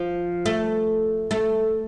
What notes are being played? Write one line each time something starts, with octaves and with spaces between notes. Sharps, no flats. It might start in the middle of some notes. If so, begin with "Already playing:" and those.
Already playing: F3
A3
A3